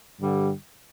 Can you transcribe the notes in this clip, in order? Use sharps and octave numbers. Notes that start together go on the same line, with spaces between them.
G2 D3 G3